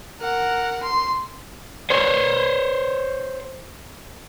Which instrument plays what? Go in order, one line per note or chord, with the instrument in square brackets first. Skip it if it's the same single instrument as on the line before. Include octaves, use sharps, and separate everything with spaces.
[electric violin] A#4 F#5
C6
[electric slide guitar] C5 C#5